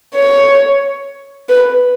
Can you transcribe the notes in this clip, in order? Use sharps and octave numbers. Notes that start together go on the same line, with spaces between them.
C#5
B4